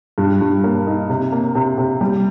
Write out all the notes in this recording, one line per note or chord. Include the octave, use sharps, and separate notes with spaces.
G2
G2
A#3
D#4
C3
A#3
C3
C3
G3